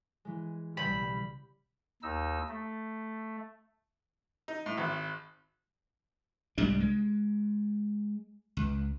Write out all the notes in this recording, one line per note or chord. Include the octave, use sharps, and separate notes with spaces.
E3 G#3
B1 A2 C#3 G3 B5 E6 G6
D#2 D#4 E6
A3
D#4
A2
G#1
C2 G#2 G3 D4
G#3
C#2